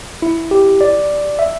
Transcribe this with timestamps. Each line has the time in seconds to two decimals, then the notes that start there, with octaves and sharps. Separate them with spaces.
0.22 E4
0.51 G4
0.81 D5
1.39 E5